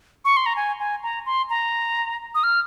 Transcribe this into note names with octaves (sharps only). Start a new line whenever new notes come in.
C#6
C6
A#5
G#5
G#5
A#5
C6
A#5
D#6
F6